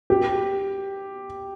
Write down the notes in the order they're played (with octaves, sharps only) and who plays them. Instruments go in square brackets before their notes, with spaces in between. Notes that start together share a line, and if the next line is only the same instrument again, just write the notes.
[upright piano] G4